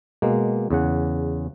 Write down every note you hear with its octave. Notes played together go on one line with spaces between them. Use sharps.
B2 G#3 A#3
E2 C#3 F#5